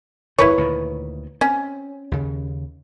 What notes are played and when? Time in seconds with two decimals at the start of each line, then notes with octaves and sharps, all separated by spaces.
0.38 D#1 A#1 D3 E4 B4 C#5
0.58 D2 A#2 D#3
1.41 C4 C#4
2.11 D#2 C#3